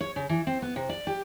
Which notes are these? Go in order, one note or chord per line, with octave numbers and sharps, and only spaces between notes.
C#5
C#3
E3
C4
B3
C3
D5
G4